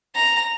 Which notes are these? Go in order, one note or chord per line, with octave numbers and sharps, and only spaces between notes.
A#5